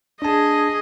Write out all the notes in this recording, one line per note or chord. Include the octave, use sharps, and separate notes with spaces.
D4 G#4 D#5 A5